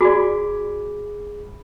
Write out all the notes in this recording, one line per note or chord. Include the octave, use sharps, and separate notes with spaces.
F#4 G#4 D5 B5 D6